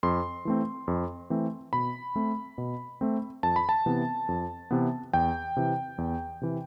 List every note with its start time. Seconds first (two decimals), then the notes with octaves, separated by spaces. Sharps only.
0.03 F2 C6
0.45 E3 A3 C4
0.88 F2
1.30 E3 A3 C4
1.73 B2 B5
2.16 A3 C4
2.58 B2
3.01 A3 C4
3.43 F2 A5
3.56 B5
3.69 A5
3.86 C3 E3 B3
4.29 F2
4.71 C3 E3 B3
5.13 E2 G5
5.56 C3 E3
5.98 E2
6.41 C3 E3